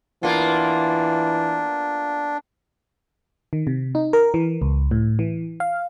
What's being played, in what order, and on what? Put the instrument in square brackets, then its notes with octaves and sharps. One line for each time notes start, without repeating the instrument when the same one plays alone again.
[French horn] E3 [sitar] A#3 B3 F4 [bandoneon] D4
[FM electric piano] D#3
C3
D#4
A#4
E3
C#2
A2
E3
F5